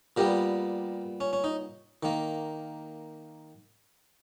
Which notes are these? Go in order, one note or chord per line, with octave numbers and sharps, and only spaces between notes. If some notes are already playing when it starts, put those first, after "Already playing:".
A#2 G3 B3 G4 A#4
C#4
C#4
D#4
D#3 A#3